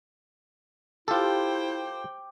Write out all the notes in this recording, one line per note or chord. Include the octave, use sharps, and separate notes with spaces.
E4 F4 G4 A4 C5 G5